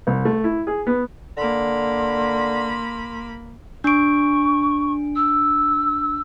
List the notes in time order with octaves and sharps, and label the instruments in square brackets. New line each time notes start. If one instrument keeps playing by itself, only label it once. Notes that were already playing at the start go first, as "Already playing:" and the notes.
[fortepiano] C2
A3
E4
G#4
B3
[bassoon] D3 [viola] A#3 B5 [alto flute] C6
[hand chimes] D4 D7 [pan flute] C#6
[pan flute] E6